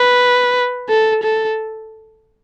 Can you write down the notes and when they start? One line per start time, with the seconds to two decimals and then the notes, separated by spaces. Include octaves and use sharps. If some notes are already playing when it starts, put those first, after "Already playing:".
Already playing: B4
0.89 A4
1.23 A4